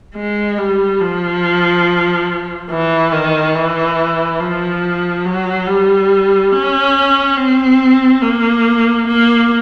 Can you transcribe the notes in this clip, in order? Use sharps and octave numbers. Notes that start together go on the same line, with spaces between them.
G#3
G3
F3
E3
D#3
E3
F3
F#3
G3
C#4
C4
A#3
A#3